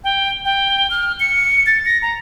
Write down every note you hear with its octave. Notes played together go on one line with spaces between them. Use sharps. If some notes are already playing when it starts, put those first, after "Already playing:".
G5
G5
F6
C#7
A6
A#6
A#5